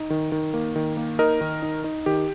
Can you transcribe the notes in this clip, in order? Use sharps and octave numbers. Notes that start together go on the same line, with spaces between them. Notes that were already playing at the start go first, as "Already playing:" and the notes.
Already playing: D#4
D#3
D#3
A#3
D#3
A#3
D#4 A#4 D#5
D#3
D#4
D#4
D#3 G4